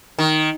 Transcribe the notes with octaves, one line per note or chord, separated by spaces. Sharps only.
D#3